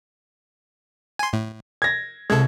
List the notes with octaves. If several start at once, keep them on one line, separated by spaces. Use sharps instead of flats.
G#5 C6
A2
G#6 A#6
C2 G#3 A4 G#6